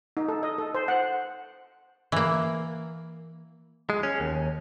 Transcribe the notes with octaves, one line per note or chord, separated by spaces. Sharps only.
D#4
A4
D#5
A4
C5
F#5
E3 A#3
G#3
C#4
D#2